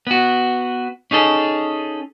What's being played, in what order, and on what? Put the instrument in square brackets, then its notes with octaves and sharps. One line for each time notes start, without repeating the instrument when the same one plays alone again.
[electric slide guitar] B3 F#4
C#4 D#4 G#4 A4